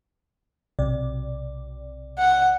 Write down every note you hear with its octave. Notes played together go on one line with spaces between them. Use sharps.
B1 C3 D5
F#5